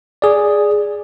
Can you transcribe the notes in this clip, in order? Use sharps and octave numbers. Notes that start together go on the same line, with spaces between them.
G#4 D5